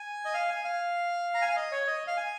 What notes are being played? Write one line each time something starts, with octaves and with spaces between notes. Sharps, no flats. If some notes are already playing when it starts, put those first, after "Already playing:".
Already playing: G#5
D#5
F5
G#5
F5
A#5
G#5
F5
D#5
C#5
D#5
F5
G#5